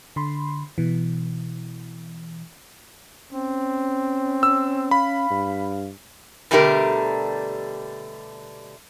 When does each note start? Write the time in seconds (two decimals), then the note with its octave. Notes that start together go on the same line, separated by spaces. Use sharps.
0.16 D3 B5 C6
0.78 B2 E3
3.33 C4 C#4
4.43 E6
4.91 F5 B5
5.30 G2
6.51 B2 D3 G3 A3 G4 A#4